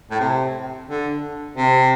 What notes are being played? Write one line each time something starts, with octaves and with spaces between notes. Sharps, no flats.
A2
C3
D3
C3